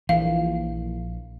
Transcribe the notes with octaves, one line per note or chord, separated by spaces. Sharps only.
A#1 E3 F5